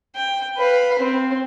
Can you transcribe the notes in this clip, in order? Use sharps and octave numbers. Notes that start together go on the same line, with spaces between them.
G5
B4 F5
C4